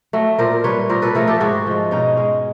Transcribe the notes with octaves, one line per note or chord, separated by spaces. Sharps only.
F#3 A3
A#2 A#4 C5
G3 B4 C#5
A#2 A#4 C5
A4 B4
F3 A3 G#4 A#4
G4 A4
G#2 F#4 G#4
F3 G#3
B2 C#4 D#4
G#3